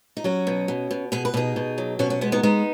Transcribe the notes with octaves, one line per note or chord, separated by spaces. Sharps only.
D#4
F#3 C#4 F#4
B2
B2
B2
B2 G#4
B4
B2 D#4 G#4
B2
F#3
B2 C#4 F#4
C#4
G#3 B3
B3 D#4
G#3 B3 D#4